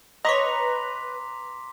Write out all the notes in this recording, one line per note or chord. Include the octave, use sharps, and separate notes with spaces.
B4 C#5 D#5 A#5 C6 D6 B6